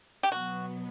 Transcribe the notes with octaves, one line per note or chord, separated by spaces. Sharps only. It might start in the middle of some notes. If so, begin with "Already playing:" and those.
G4
B2 F#3 B3 F#4